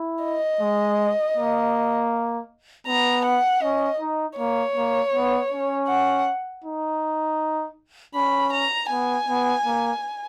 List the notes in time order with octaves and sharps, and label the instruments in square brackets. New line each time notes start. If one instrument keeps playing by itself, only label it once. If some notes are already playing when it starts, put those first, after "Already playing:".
Already playing: [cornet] E4
[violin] D#5
[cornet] G#3
A#3
[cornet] B3 [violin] A#5
[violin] F#5
[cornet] C#4 [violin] D#5
[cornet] D#4
[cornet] A#3 [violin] C#5
[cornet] A#3
B3
C#4
[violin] F#5
[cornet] D#4
[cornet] C#4 [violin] B5
[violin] A#5
[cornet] B3 [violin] G#5
[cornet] B3
A#3